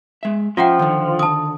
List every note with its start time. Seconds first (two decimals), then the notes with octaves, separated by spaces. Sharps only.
0.23 G#3 E5
0.57 F3 C#4 F4 E5 F#5 G5
0.79 D3 D#3
1.19 A5 D#6